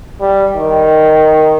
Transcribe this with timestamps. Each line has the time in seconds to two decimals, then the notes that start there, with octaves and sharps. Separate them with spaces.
0.21 G3
0.57 D#3